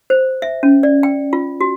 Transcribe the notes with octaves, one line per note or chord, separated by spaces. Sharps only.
C5
E5
C#4
D5
G5
F4
F#4